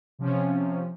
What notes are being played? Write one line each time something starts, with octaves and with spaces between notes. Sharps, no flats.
C3 F3 C#4